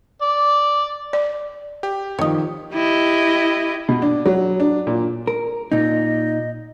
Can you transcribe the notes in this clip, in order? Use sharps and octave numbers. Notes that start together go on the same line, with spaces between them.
D5
D5
G4
D#3 F3 C#5 D#5
E4 G4 D#5
B2
D4
F#3
D4
A#2
A#4
A#2 D#4 D#5